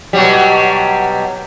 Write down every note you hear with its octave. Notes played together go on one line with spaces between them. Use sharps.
B2 F#3 G3